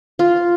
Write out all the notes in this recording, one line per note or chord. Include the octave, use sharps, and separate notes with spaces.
F4